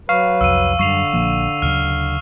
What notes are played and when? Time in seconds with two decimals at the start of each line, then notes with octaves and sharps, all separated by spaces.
0.09 F#3 B4 F5 C#6
0.41 C2 F2 E6 D#7
0.79 F#2 D3 F#3 G3 C#6 C7 F7
1.13 A#1 F3 A#3
1.62 D2 C#3 F#3 F6